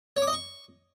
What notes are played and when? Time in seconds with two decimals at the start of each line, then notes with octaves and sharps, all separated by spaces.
0.17 C#5
0.22 D6
0.27 D#5
0.33 C#6